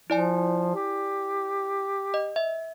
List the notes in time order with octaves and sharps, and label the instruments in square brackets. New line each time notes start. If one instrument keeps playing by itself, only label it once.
[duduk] F3 [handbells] E4 D5 G#5
[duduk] G4
[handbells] D#5
E5